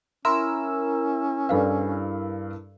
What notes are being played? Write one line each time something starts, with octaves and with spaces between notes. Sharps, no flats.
C#4 E4 A#4 C6 E6
G2 A4 B4 D5 F5